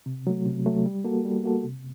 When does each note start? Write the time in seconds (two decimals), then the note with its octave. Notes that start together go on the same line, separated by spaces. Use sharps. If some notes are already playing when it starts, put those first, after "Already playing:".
0.06 C3
0.27 F#3 A3
0.46 C3
0.66 F#3 A3
0.86 G3
1.05 A#3 F#4 A4
1.25 G3
1.44 A#3 F#4 A4
1.63 C3